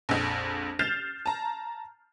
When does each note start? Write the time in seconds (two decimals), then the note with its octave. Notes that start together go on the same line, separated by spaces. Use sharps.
0.09 A#1 F2
0.79 F6 G6 A6 C7 E7 F7
1.26 A5 A#5